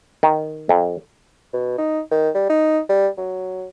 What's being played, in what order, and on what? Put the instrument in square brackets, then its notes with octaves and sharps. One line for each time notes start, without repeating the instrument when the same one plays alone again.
[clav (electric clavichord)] D#3
F2
[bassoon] B2
D#4
D#3
G3
D#4
G3
F#3